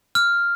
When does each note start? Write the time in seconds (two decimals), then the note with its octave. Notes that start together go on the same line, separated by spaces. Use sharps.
0.15 F6